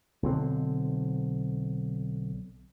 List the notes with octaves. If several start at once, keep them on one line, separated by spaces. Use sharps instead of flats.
B1 D3 C4